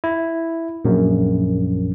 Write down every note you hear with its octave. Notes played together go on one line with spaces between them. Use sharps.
E4
A#1 F#2